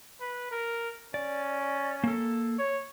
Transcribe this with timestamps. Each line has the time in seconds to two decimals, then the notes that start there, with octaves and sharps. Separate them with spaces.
0.20 B4
0.51 A#4
1.14 C#4 D5
2.04 A#3 A4
2.59 C#5